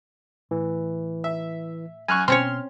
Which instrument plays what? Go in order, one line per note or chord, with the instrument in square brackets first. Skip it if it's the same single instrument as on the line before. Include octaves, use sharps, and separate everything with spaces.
[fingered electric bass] A2 [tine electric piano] E3
[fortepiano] E5
[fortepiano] F#2 C#6 [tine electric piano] G#5 F6 F#6
[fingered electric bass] B2 [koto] C4 C#4 C#5 [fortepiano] C6 [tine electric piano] F6